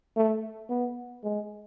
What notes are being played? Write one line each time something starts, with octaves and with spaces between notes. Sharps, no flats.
A3
B3
G#3